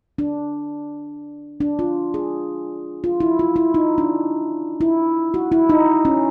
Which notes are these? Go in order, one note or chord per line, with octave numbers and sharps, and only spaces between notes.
D4
D4
F4
G#4
F4
E4
F4
E4
D#4
D4
E4
F#4
E4
D#4
C#4